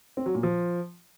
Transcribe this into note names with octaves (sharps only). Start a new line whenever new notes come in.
C4
F#3
A#2
F3